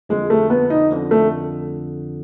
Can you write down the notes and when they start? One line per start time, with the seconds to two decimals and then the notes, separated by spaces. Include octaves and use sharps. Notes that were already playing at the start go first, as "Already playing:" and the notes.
0.09 F2 D3 F3 G#3
0.30 A3
0.50 B3
0.70 D#4
0.91 F2 D3 F3
1.11 A3